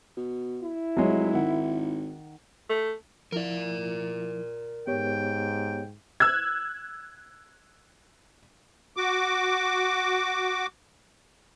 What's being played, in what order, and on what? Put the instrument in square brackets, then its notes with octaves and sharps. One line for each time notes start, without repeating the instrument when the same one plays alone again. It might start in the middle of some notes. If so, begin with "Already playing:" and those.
[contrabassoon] B2
[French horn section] E4
[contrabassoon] F1 [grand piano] F#3 G#3 C#5
[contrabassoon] G#1 [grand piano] D#3 F#5
[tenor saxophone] A3
[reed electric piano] F3 E4 [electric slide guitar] A#4 D5
[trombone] G#2 [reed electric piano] B3 G4 C#5 [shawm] G5
[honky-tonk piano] E6 F#6 G#6
[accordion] F#4 D6